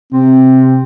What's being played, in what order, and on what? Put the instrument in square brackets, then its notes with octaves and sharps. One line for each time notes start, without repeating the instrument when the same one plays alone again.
[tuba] C3 [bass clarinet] C4